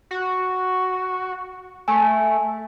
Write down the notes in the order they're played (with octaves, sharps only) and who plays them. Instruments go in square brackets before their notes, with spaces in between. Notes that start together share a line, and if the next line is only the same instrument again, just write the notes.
[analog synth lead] F#4
[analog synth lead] A3 [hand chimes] G#5